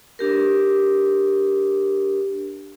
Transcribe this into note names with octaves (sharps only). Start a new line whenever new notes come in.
D4 G4 A#4